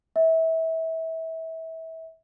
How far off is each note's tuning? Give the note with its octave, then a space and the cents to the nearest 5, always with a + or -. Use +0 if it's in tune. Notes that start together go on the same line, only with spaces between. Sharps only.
E5 -25